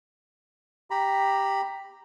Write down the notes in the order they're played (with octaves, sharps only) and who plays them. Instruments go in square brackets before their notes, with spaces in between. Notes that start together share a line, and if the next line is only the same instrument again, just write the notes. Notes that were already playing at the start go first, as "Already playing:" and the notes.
[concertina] G4 A#5 B5